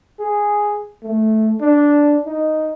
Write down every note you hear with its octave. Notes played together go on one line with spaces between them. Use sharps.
G#4
A3
D4
D#4